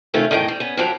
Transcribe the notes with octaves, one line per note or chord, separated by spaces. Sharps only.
C3 D#3 A3 C#4 F4 G4
E2 A2 D#3 G3 D#5 G5
G3
B3 C#4
G2 D3 F3 F#3 G4 A#4